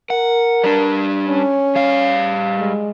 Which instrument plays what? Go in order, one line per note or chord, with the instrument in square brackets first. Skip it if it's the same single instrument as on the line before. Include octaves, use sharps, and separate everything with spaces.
[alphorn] A#4 [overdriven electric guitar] F#5
[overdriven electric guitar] G3 D4
[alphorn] C#4
[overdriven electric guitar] G3 F5
[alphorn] G#3